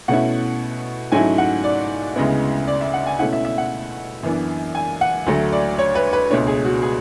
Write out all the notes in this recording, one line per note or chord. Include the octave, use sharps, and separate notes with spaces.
B2 A3 C#4 E4 F#5
G#2 F#3 A3 C#4 E4 G#5
F#5
D5
D2 C#3 G#3 B3 E4
D5
E5
F#5
G#5
B2 A3 C#4 E4 F#5
E5
E5
F#5
F#2 E3 B3 D4
G#5
F#5
D2 D3 F#3 A3
D5
C#5
B4
B4
C#2 B2 A3 D4 C#5
G#4
F#4
G#4